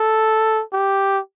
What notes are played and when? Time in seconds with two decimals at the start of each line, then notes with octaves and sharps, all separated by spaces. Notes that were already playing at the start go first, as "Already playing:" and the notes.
Already playing: A4
0.73 G4